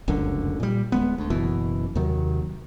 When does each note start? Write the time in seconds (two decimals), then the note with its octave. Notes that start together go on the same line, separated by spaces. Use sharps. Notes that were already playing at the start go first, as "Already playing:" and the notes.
0.08 F1 C#2 F#2 D3
0.60 A#2 G3
0.92 D1 G#3 B3
1.18 D2
1.30 F#1 F#2 B2 E3
1.95 D#2 C3 D#3 F#3